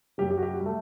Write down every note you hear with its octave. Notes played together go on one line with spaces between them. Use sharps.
F#2 F#3 G4
G4
F#4
G4
F#4
G3
A3